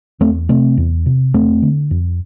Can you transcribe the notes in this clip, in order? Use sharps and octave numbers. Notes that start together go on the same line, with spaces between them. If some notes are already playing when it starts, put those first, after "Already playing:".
E2 A3 C4
C3 A3 C4
E2
C3
E2 A3 C4
D3
F2